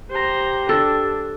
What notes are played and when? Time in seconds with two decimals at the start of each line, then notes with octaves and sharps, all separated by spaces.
0.10 G4 C5 A#5
0.69 D4 A4